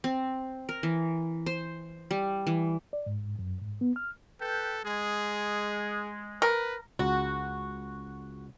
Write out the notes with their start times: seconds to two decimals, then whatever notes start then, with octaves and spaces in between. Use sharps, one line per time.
0.04 C4
0.69 A#4
0.83 E3
1.46 C5
2.11 G3
2.47 E3
2.93 D5
3.06 G#2
3.39 F#2
3.61 G#2
3.81 B3
3.96 F6
4.41 A4 B4 G5
4.85 G#3 G#4
6.42 A#4 B4
6.99 C#2 F#4